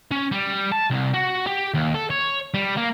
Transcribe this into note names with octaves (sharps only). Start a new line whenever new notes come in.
C#4
G3
A5
C2
F#4
G4
D#2
A4
C#5
G3
A#3